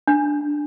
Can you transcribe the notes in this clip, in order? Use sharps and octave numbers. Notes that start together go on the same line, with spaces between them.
D4